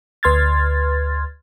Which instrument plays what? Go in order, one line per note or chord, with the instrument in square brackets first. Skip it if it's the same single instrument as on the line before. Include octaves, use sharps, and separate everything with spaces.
[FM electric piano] D2 B4 C6 F6 G#6 A6